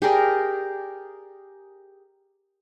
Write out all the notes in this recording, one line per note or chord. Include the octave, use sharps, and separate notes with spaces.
G4 G#4 A#4 D5